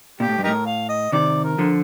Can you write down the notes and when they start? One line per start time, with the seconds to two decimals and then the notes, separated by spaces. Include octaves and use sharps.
0.20 A#2 G4
0.29 A2
0.38 G2
0.43 A2 D#4 G4 A#4
0.66 F5
0.89 D#5
1.12 C3 D#3 D5
1.44 A#4
1.58 D3 F3